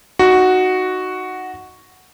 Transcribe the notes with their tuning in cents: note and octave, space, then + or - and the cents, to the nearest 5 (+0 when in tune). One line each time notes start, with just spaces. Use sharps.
D#4 +0 F#4 +0